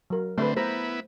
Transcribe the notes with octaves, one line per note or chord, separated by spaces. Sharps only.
F#3 A#4
D3 A3 C4 B4 E5
B3 E4 A#4 C5